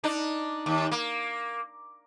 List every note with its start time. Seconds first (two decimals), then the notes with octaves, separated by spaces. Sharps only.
0.04 D4 D#4
0.66 D#2
0.92 A#3